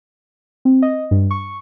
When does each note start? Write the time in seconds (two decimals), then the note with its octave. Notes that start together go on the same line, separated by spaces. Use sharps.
0.65 C4
0.82 D#5
1.11 G2
1.31 C#6